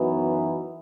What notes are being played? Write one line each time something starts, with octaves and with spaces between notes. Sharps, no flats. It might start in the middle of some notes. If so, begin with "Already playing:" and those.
Already playing: F#2 E3 B3 D#4 F#4